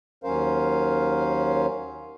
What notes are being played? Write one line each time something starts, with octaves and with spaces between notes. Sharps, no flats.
D#2 F#3 C#4 A#4 C5 F5